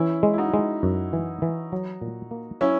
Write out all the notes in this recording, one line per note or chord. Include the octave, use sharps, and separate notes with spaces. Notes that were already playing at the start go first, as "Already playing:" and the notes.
Already playing: E3 C#4 E4
G#3
E4
D#4 F#4
G#3
F#2
E3
E3
F#3
A#2
A#3
F#3 C#4 E4